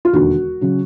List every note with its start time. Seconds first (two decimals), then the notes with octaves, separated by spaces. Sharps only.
0.05 F4
0.13 E1 D#2 D3 F#4
0.61 C#3 F#3